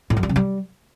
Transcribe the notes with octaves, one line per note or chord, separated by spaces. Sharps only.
A2
F#2
G3
C#3
G3